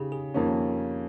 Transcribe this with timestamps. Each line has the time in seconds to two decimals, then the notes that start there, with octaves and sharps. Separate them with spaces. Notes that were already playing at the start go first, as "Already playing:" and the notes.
Already playing: C#3 D#4 G4 G#4
0.12 G#4
0.34 F2 D#3 A#3 C#4